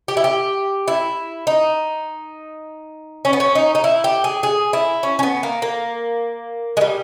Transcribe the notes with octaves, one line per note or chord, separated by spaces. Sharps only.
G4
E4
G4
E4
D#4
C#4
B3
C#4
D#4
D#4
E4
G4
G#4
G#4
E4
C#4
C#4
B3
A#3
A#3
G#3
G3